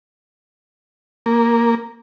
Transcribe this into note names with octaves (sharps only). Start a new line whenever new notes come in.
A#3